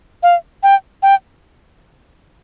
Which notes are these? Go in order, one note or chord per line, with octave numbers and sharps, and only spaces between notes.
F5
G5
G5